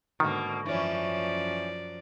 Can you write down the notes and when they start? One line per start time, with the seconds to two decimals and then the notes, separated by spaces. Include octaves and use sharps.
0.20 G#2 B2 D3 D#3 A#3
0.66 F#2 E3 F3 C#4 D5